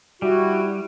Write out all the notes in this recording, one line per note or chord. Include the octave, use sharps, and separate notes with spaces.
G3 E4 F#4